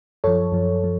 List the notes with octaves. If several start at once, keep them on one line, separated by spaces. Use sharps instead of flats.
F#2 F3 A4 C#5
F#2 F3
F3